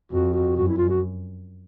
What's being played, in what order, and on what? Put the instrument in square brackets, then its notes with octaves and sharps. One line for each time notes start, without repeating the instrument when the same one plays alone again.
[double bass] F2 [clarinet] F#4
[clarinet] F#4
[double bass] F#2 [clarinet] F#4
[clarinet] E4
F4
F#4